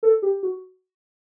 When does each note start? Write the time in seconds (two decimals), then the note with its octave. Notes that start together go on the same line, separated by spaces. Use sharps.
0.03 A4
0.22 G4
0.43 F#4